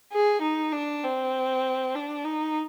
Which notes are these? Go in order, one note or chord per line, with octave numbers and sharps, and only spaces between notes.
G#4
D#4
D4
C4
D4
D#4